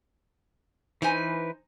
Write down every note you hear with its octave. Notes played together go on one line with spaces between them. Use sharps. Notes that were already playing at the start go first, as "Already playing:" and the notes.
E3 D#4 B4 C5 G#5